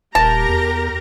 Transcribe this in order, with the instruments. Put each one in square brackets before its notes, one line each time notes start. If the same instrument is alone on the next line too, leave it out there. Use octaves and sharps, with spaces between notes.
[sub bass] D#1 [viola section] G4 A#4 A#5 [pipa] A5
[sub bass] E2